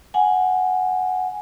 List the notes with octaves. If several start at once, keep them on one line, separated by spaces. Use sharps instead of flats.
F#5 G#5